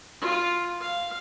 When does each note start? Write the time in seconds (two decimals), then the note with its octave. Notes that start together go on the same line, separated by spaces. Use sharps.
0.22 F4
0.81 F5